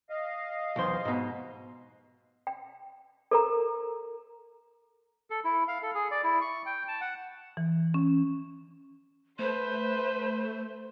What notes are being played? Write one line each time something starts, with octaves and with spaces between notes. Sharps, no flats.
D#5 F5
B1 E2 C5
G#2 B2
G5
A4 A#4 A#5
A4
E4
F5
A4
G#4
D5
E4
C#6
G5
A5
F#5
E3
C#4
A3 B4 C5 C6